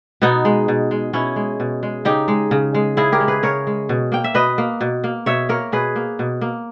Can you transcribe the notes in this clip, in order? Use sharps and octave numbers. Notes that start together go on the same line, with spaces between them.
B2 B3 D#4
G#3
B2
G#3
B2 C#4 E4
G#3
B2
G#3
C#3 D#4 G4
G#3
C#3
G#3
C#3 E4 G#4
G4 A#4
G#3
G#4 B4
C#3 A#4 C#5
G#3
B2
A#3 G5
E5
B2 B4 D#5
A#3
B2
A#3
B2 C#5 E5
A#3 A#4 C#5
B2 G#4 B4
A#3
B2
A#3